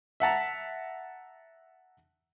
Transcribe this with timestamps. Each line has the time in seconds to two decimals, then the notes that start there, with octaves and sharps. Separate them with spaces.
0.20 E5 F#5 A5 A#5